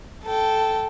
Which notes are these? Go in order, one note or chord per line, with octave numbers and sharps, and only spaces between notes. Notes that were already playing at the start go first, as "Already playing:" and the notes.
A4 G5